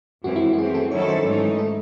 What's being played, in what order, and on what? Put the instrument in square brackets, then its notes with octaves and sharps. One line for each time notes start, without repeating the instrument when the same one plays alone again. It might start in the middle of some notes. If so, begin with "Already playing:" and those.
[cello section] F#2 E3 G#3 C4 [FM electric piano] F#4
[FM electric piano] E4
F#4
[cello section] E3 A3 C4 [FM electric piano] G#4
[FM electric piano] A4
[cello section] D#3 F#3 C#4 E4 A4 [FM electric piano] C#5
[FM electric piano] C5
[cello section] G#2 E3 A3 D#4
[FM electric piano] A4